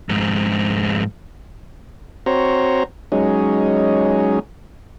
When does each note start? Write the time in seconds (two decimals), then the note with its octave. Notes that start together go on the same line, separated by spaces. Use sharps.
0.09 F2 G#2
2.26 C4 F#4 C5 C#5 A#5
3.12 F#3 G#3 C#4 D#4